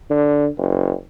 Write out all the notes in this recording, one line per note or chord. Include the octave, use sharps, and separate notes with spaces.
D3
F#1